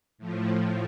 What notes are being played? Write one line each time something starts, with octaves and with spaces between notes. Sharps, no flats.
A2 F3